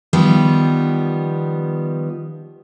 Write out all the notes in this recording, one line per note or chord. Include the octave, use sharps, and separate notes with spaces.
D#3 F3 G3 B3